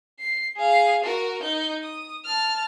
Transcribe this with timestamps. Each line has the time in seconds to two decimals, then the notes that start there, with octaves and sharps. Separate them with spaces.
0.20 C7
0.57 G#4 F5
1.04 F#4 A#4
1.42 D#4 G6
1.83 D#6
2.25 A5 F6